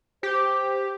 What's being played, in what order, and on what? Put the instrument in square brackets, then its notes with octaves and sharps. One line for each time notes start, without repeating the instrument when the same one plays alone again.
[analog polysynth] G4 [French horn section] C5